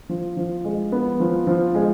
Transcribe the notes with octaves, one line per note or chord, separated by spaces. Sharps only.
F3
F3
G#3
B3
F3
F3
G#3